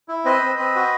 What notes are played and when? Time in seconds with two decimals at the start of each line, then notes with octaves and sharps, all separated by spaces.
0.08 E4
0.25 C4 B4 D#5
0.43 C4
0.59 C4
0.75 F#4